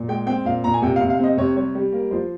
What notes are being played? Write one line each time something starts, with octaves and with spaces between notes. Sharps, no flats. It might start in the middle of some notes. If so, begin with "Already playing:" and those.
Already playing: A#2
G#3 G5
C4 G5
A#2 F5
A#2 A#5
G#5
C3 G5
F5
C3
F5
C4 D#5
C3 C#5
G3 C#5
G3
A#3
F3 C5